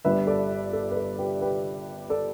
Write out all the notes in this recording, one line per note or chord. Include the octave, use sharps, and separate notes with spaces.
G1 G2 G3 B4 E5
A4 D5
A4
B4
A4
G4 B4
G4 B4
A4 D5